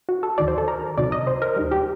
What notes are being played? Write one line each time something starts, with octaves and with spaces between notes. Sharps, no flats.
F#4
A4
D#2 D#3 F#3 D5
C5
A4
A#4
C2 C3 D#3 F#3 D5
D#5
C5
A#4
D#2 D#3 G3
G4